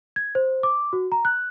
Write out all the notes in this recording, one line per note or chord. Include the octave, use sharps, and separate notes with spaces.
G#6
C5
D6
F#4
A#5
F#6